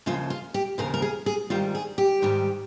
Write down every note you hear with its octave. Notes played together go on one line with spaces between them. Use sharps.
D#2 C#3 F3 F4
F4
G4
D#2 C#3 F3 A#4
A#4
G#4
G#4
G#2 D#3 G3 F4
G#4
G4
G#2 D#3 G3